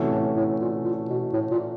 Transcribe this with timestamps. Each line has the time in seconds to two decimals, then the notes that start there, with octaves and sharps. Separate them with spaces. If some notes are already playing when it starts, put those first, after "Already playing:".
Already playing: C3 E3 A3 C#4 F#4
0.11 A2
0.36 A2
0.61 A#2
0.84 A#2
1.10 B2
1.33 A2
1.51 A#2